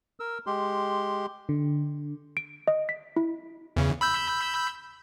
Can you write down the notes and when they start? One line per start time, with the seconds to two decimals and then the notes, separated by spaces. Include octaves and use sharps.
0.20 A#4 E6
0.46 G#3 G4 C6
1.49 D3
2.37 D7
2.68 D#5
2.89 B6
3.16 E4
3.76 E2 C#3
4.01 B5 E6 G6